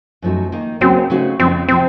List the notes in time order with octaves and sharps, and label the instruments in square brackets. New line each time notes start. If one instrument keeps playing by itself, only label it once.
[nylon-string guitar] F#2 F3 A3 D#4 F#4
D#3 A#3 D#4
[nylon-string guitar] C#3 F#3 A#3 C#4 F#4 [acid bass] C4
[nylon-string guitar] C#3 A3 D#4 F#4
[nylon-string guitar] F2 C#3 F3 [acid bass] C4
[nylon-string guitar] C3 F3 [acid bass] C4